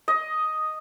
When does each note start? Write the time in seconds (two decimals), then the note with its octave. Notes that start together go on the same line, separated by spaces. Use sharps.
0.08 D#5